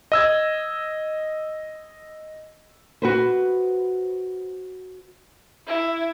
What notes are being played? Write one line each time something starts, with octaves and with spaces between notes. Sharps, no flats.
D#5 E6 G#6
F#4 B4 C5
E4